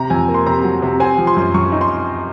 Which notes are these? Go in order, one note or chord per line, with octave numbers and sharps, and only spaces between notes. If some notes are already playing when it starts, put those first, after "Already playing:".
Already playing: C3 A#5
F2 G#5
A#3
C6
C3 A#5
F#3
C3
C4 G#5
F3
C6
F#2
F#2 C#6
D#4
C6